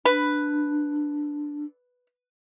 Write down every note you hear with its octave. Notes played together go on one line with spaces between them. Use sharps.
D4 B4